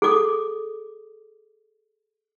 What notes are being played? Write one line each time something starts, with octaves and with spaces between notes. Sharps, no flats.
G#4 A4 D6 D#6